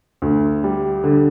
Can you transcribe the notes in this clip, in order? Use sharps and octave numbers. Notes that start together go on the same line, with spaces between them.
D2
G3
D3